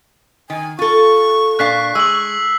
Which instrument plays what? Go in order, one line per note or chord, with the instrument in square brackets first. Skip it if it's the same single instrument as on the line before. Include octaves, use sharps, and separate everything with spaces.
[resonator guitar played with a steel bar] D#3 [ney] G#5
[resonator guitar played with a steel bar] F4 A4 [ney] C#6
[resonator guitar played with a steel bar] A#2 D4 F5 [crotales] F#6 B6 C7
[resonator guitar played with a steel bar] G#3 [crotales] E6 F#7